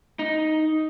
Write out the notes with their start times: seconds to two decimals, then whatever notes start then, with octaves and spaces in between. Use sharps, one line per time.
0.19 D#4